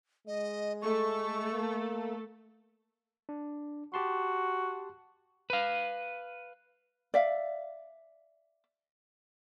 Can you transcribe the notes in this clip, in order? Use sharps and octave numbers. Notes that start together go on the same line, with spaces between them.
G#3 D#5
A3 A4 C#6
A#3
D4
F#4 G4 A5 C6
B4 F5
D5 E5 F5